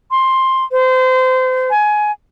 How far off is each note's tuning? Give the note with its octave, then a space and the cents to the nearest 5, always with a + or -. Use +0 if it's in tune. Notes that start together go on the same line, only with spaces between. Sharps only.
C6 +10
C5 -30
G#5 +20